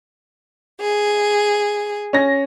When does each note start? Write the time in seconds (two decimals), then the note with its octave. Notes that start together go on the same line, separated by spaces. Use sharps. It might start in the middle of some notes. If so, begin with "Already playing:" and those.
0.80 G#4
2.13 C#4 A#6